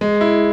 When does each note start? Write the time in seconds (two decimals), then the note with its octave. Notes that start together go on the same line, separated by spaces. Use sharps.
0.01 G#3
0.21 E4